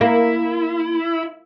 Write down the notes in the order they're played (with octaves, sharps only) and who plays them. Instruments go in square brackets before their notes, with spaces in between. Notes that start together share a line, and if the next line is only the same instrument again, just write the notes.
[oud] A#3 [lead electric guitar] E4